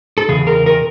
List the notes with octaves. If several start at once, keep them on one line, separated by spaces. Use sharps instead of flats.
A4
E2 C#3 G#4
A#4
A#4